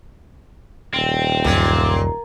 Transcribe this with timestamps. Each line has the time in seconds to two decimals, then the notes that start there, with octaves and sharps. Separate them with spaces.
0.94 D#1 C4
1.44 C#2 F#2 A#2